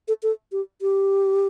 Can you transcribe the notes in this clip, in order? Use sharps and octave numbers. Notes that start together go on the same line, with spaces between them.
A4
A4
G4
G4